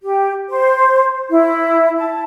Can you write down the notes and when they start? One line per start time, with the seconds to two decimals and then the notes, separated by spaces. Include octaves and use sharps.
0.02 G4
0.50 C5
1.30 E4
1.98 A5